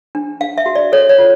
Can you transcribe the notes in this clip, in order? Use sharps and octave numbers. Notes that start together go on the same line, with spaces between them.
D4
D4 F5
E5
F#4
D5
A4 C#5
C#5
F4